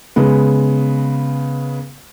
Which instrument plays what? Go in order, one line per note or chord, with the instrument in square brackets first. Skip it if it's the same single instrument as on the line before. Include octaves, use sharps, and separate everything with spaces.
[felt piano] C#3 G#3 B3